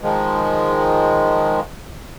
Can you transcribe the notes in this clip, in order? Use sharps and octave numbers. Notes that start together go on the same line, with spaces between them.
D#3 F3 G#3